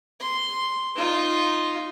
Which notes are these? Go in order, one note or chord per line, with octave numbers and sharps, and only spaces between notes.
C6
D#4 F4